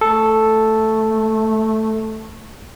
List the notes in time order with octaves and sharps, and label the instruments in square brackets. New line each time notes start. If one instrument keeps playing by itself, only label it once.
[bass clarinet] A3 [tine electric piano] A4